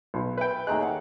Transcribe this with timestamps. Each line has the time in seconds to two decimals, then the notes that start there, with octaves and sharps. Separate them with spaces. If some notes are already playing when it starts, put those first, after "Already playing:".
0.14 B1
0.38 B4 E5 G5
0.67 D#2 G#3 A3 G5 A#5 F#6
0.79 C#5 F5 F#5